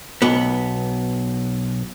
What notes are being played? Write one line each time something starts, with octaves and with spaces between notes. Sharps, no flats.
B1 B3